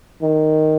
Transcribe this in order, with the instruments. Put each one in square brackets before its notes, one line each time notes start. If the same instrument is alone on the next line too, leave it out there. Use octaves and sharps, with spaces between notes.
[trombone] D#3